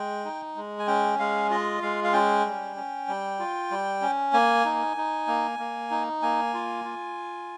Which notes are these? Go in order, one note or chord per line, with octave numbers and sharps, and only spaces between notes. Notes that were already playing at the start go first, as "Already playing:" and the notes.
Already playing: G#3 G5
D#4
G#3
G#5
C#4 G5
G#3 F5
F4 D#5
G#3 F5
F5
C#4 G5
G3
C#4
G3
F4
G3
C#4
A#3 G#5
D#4
D#4
A#3
A#3
D#4
A#3 G#5
F4
F4